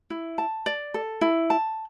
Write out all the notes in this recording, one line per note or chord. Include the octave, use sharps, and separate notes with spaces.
E4
A5
D5
A4
E4
A5